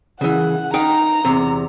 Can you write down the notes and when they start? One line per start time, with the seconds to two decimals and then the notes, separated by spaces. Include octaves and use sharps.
0.21 C#3 E3 F#5
0.74 D#4 G5 A#5
1.25 E2 C3